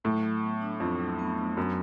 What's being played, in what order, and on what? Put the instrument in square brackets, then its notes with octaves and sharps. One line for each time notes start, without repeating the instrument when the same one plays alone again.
[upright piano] A2 [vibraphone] F#3
[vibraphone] F#3
B3
D4
[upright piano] F2 [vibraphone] F#3
[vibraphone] F#3
B3
D4
[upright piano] F#2 [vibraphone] F#3